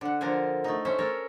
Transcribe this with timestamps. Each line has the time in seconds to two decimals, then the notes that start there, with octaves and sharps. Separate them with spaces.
0.01 D3 F#5
0.21 D3 F3 A#4 C5 F5 G#5
0.64 A3 D#4
0.85 C#4 C5 E5
0.99 A4 A#4 C#5